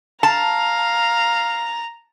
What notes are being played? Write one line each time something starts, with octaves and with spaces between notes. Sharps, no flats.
F5 A5 A#5